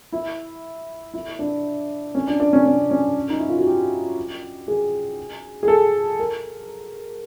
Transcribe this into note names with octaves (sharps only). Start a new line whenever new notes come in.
E4
E4
D4
C#4
D4
D4
C#4
C#4
C#4
D#4
E4
F4
F#4
G4
G#4
G#4
A4
A#4